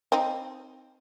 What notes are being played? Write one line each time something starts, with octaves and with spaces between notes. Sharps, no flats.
C4 D#4